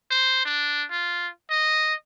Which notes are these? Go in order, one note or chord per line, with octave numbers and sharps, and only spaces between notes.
C5
D4
F4
D#5